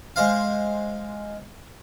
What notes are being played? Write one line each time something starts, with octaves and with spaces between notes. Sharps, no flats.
G#3 C5 F5